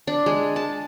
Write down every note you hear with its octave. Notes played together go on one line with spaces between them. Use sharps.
D4
G#3
A5